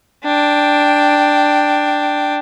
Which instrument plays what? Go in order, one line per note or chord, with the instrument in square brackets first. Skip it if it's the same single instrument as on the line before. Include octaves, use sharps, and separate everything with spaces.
[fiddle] D4 G5